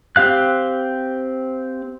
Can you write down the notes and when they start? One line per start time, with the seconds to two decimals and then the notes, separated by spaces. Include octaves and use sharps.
0.16 C4 G4 F5 F#6